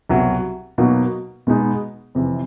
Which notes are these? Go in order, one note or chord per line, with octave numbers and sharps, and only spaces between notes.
C2 B2 F#3
B2 F#3 A#3 D#4 F#4
B2 G#3 B3 D#4
F2 C3 E3